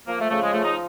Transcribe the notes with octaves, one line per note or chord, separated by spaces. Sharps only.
F3 A#3
A3
C#3 A3
G#3
F3 A3
D#4